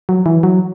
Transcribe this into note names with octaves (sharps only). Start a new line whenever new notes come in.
F#3
E3
F#3